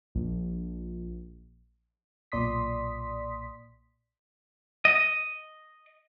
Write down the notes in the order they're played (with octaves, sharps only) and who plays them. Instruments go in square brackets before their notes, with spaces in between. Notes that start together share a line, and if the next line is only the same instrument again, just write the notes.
[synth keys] A#1
[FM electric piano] B1 A#2 D5 C6 D#6 B6
[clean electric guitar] D#5